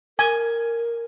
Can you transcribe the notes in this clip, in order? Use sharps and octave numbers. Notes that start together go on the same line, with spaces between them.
A#4 G#5